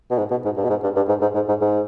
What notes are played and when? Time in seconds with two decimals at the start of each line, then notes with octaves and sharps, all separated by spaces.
0.11 B2
0.18 G#2
0.31 B2
0.45 G#2
0.57 G2
0.64 B2
0.70 G#2
0.83 G2
0.96 G2
1.08 G#2
1.21 G#2
1.35 G#2
1.49 G#2
1.61 G#2